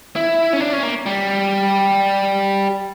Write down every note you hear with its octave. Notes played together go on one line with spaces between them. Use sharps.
E4
C#4
D4
C#4
A#3
G3